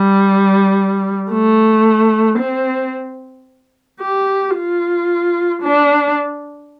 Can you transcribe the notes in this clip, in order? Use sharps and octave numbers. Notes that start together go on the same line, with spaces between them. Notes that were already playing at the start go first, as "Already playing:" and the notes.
Already playing: G3
A3
C4
G4
F4
D4